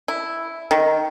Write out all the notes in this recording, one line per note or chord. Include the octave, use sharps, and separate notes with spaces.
E4
D#3